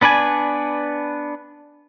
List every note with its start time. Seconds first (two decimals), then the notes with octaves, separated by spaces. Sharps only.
0.01 B3 D4 B4 D5 G#5